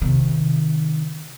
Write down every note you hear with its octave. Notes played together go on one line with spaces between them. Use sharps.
C3 D#3